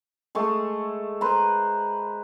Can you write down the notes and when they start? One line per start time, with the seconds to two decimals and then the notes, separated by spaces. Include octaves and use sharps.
0.35 G#3 A3 G#4
1.21 B4 C5 A#5